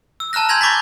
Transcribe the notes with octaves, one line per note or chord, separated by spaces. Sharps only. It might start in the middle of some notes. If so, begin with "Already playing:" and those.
E6
A5 A#5 F6 F#6 A#6
G#5 C6 G6 G#6 A#6 F7
B5 C#6 D6 G6 A6 B6